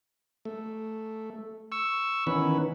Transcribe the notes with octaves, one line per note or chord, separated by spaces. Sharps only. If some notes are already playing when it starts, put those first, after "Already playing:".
A3
C#6 E6
D#3 E3 B3 C#4 B4